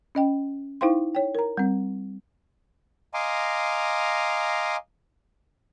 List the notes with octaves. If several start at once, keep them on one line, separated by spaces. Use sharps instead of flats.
C#4 D#5 G5
D#4 E4 C5 F5 G5 C6
C#5 G5
A#4 A#5
G3 C4
D#5 F5 G#5 A#5 C6 D6